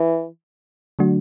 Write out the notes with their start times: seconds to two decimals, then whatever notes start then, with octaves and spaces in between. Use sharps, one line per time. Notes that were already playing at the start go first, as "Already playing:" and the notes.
Already playing: E3
0.99 D3 F#3 A3 D4 F#4